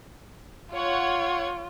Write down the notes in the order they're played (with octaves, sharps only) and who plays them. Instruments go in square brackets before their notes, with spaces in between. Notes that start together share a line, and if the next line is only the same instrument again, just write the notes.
[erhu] F4 [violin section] C#5 F#5 G#6